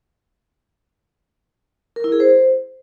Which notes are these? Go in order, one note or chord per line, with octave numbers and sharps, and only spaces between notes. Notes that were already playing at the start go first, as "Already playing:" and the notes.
A#4
E4
G#4
C5